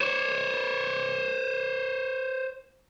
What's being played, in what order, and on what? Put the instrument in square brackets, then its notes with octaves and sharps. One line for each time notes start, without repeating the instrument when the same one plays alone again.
[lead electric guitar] C5 C#5